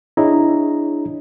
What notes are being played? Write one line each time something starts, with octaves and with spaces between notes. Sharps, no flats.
D4 E4 G#4 C#5 D#5 A#5